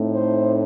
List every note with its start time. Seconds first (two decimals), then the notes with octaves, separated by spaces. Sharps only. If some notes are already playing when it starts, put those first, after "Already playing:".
Already playing: A2 A3 C4 D#4
0.14 C5